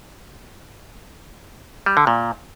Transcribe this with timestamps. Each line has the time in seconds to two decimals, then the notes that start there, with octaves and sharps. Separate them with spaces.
1.86 G3
1.97 D3
2.07 A#2